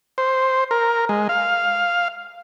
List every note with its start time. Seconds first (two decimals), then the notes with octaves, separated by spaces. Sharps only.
0.18 C5
0.71 A#4
1.09 G#3
1.29 F5